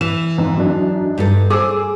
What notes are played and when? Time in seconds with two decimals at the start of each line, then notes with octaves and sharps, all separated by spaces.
0.01 E3 E7
0.38 F2 G#2
0.57 F#2 D4 D#4
1.18 G2 D#4 A4
1.50 G#4 C5 D6 E6